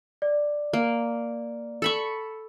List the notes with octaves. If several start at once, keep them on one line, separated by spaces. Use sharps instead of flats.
D5
A#3
A4 B5 C#6